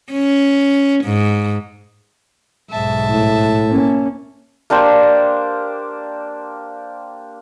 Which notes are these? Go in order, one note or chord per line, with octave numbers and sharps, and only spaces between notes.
C#4
G#2
B1 G#2 E5 A5
A2
A#3 C#4
A#3 D4 G4 C5